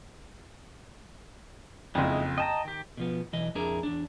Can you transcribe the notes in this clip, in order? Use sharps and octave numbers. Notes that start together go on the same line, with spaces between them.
F#1 F2 G#3 D#4 E4
D#5 G5 A5 A#5
D#3 G4
B2 F3 B3
B1 E3 D#5
F2 D4 E4 G#4 A#4
E2 D4